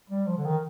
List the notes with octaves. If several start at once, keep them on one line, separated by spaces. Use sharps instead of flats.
G3
F3
D3
D#3